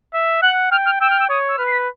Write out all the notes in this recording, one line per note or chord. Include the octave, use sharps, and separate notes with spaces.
E5
F#5 F#6
G5 F6
F6
G5 E6
F6
E6
C#5 D#6
E6
B4 F6
C7
B6